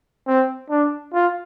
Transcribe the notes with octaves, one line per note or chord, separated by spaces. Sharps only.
C4
D4
F4